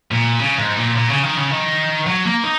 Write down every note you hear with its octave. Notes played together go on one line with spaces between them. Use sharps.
A#2
C#3
G#2
A#2
A#2
C#3
D#3
C#3
D#3
F#3
A#3
D#4